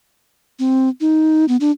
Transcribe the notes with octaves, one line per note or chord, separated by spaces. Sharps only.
C4
D#4
B3
D4